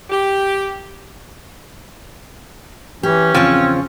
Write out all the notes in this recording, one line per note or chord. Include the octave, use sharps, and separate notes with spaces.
G4
E3 C#4 G4
E2 C#3 F3 C4 C#5